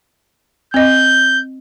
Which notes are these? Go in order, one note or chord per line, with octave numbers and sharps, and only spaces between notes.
C4 D#5 G6